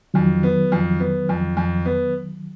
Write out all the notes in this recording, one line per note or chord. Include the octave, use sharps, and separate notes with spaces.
F2 D#3 F#3
B3
F2
B3
F2
F2
B3